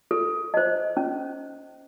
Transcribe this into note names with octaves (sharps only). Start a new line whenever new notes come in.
A4
C5 D#5
C#4